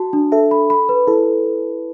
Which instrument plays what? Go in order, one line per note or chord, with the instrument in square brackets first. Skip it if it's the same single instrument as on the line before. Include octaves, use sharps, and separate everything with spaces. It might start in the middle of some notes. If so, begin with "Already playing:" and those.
Already playing: [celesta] F#4 A5
D4
[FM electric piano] A4 [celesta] E5
[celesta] B5
B5
B4
[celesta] E4 [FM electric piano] A4